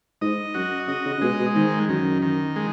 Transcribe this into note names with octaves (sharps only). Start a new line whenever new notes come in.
G#2 D#5
F#2 F#4
C#3 D#5
C#3
C#3
B2 G#3
B2
G#2 D#3
F#2 D#3
D#3
G#3